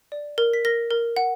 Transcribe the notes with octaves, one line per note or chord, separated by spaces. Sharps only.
D5
A#4
B6
A#4 A#6
A#4
F#5